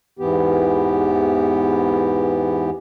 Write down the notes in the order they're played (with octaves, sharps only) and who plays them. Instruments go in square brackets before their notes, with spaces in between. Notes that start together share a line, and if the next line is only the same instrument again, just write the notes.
[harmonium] E2 G#2 E3 B3 G4